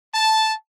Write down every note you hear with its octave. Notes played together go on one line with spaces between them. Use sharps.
A5